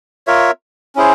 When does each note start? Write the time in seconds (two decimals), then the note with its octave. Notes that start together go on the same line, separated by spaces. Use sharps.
0.27 F4 A#4 C#5 E5
0.96 C#4 E4 G#4 C5